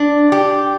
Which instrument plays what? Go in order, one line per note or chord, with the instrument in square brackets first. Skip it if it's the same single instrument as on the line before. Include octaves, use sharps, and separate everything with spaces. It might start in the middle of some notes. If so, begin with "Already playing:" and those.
Already playing: [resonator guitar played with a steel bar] D4
G4